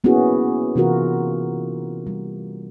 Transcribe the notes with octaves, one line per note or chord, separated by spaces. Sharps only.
A#3 B3 C#4 E4 F#4 G#4
C3 E3 F4 F#4 A#4
G3